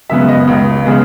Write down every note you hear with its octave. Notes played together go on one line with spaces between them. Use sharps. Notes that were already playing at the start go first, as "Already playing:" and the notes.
F#2 C#3 G#3 B3 E5
D#5
C#2
C#3 G#3 B3